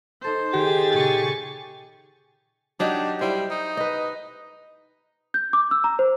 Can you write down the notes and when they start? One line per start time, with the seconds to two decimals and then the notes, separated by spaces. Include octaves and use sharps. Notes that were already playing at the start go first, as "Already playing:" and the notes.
0.22 D#4 A4 C5 C6
0.54 D#3 G4 G#4 A6
0.93 A#2 C#3 G#5 C#6
2.80 F#3 D4 D#4 G4
3.21 G3 E4 C5
3.51 D#4
3.77 B4 D#5
5.34 G6
5.53 D6
5.71 E6
5.84 A#5
5.99 C5